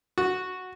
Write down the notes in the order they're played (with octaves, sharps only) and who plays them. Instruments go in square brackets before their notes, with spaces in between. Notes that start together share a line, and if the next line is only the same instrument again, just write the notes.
[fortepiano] F#4